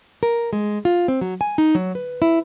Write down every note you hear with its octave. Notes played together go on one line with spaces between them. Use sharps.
A#4
G#3
F4
C4
F#3
G#5
D#4
F#3
B4
E4